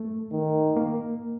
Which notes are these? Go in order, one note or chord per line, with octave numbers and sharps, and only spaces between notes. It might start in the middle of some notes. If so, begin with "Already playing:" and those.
Already playing: A3
D#3
A#3